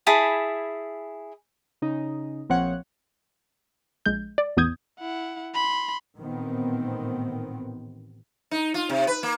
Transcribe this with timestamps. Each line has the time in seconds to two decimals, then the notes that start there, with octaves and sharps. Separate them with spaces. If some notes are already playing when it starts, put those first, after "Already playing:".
0.06 E4 G#4 A5 B5
1.82 C#3 D#4
2.50 A#1 F3 C4 C#5 F#5
4.06 A#1 G#3 G6
4.38 D5
4.57 A1 E2 B3 D#6 G6 G#6
4.99 E4 F#5
5.54 B5 C6
6.17 A1 A#2 D#3 B3 C4
8.51 D#4
8.74 F4
8.89 C3
9.07 B4
9.23 A#3